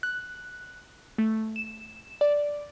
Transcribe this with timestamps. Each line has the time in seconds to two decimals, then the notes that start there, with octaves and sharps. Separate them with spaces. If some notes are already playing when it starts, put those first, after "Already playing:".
0.03 F#6
1.18 A3
1.56 E7
2.21 D5